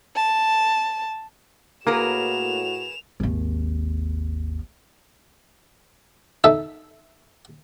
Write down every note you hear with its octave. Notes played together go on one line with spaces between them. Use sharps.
A5
A2 A#3 F#4 G#4 A#4 B4 E7 F7
G#1 D#2
D#4 A4 E5